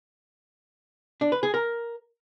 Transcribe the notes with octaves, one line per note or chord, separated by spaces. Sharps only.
D4
B4
G#4
A#4